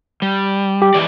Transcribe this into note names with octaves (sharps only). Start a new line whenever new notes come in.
G3
G4
E3 G#3 D5